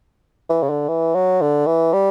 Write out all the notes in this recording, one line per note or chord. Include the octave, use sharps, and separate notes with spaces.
E3
C#3
D3
E3
F#3
D3
E3
G3